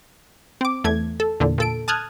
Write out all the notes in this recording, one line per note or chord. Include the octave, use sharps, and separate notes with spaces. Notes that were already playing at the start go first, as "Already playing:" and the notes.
C4 D6
E2 A3 G#6
A4
E2 A#2 D3
A#2 A4 D7
A5 D#6 F6 F#6 G#6